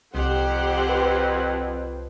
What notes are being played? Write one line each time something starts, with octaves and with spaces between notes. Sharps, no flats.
C2 F2 G4 C5 F#5
B4